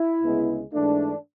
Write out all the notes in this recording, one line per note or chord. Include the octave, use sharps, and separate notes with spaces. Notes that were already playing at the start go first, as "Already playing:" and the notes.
Already playing: E4
D2 C#3 G#3 B3
G#2 E3 A3 D4